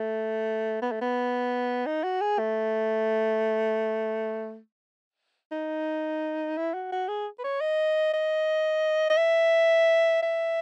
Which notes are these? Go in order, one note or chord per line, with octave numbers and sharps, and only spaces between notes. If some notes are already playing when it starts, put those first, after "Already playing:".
Already playing: A3
B3
A3
B3
D#4
F#4
G#4
A3
D#4
E4
F#4
F#4
G#4
B4
C#5
D#5
D#5
D#5
E5
E5